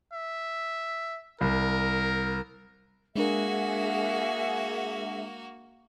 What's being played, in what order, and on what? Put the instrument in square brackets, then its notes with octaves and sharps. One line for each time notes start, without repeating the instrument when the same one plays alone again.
[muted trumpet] E5
[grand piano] C2 [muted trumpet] A#4
[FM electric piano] G#3 D4 A#4 [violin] A#3 F#4 [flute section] G#4 E5 F#5